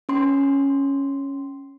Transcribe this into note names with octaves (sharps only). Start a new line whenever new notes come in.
C#4 C6